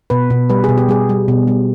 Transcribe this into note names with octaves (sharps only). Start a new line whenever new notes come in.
B2 B4
B2
G3 B4
G#4
B2
G4
G3 G#4
G3
B2
G3